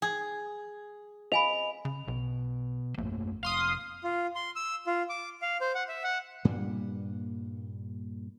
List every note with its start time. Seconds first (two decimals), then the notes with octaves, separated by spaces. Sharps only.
0.02 G#4
1.32 D#5 F5 G#5 B5 F7
1.85 C#3
2.08 B1 B2
2.98 A#1 F#2 A3 A#3
3.43 F1 F5 C6 D#6
4.04 F4
4.35 C6
4.56 E6
4.87 F4
5.10 D6
5.42 F5
5.61 C5
5.75 F#5
5.88 E5
6.04 F#5
6.45 G2 A#2 G3 A#3